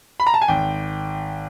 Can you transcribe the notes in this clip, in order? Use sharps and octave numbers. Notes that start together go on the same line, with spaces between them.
B5
A#5
A5
G#5
G#1 G5